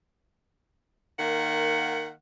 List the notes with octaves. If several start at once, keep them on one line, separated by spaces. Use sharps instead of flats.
D#3 A#3 F#5